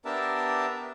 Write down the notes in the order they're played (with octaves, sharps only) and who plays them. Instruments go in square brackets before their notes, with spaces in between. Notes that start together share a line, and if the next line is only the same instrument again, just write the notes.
[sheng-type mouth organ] B3 D4 G4 A#4 E5 A5